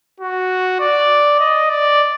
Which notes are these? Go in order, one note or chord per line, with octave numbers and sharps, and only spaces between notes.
F#4
D5
D#5
D5